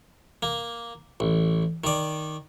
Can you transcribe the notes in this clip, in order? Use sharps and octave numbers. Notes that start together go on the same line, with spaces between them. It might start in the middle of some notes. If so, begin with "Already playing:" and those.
A#3
A1
D#3 D5